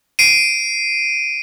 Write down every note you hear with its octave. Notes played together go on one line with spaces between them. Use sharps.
C7 D7 D#7